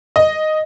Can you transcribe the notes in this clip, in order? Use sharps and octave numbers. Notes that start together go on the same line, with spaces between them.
D#5